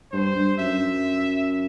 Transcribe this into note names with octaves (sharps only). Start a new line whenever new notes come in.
G2 C5
G2
F#2 E5